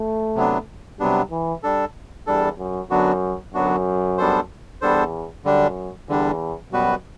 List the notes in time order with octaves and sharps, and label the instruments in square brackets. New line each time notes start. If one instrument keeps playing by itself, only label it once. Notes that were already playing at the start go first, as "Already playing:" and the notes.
Already playing: [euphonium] A3
[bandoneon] C3 F#3 B3 D4
[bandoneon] C3 F#3 B3 D4 [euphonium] G3
[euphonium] E3
[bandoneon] G3 D4 A4
[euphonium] E2 [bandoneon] G3 D4 A4
[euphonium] F#2
[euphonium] F#2 [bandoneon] D3 F#3 B3 D4 F#4
[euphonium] F#2 [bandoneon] D3 F#3 B3 D4 F#4
[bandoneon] G3 B3 D4 A4 C5
[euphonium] E2 [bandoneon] G3 B3 D4 A4 C5
[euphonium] F#2 [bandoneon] D3 G3 D4
[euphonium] E2 [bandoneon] D3 G3 D4
[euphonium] F#2 [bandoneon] B2 G3 B3 F#4 B4